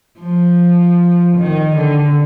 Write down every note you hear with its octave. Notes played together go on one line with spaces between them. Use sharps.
F3
D#3
D3